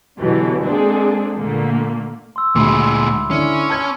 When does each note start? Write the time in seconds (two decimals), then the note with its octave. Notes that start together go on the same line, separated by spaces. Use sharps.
0.20 B2 D3 E3 F#3 G3
0.62 G#3 A#3 C4 D4 G#4 A4
1.37 A#2 D3 A3 A#3
2.36 C6 E6
2.55 D2 A#2 G#3 B5 C6 D6
3.31 D3 C#4 E4
3.70 A5 G#6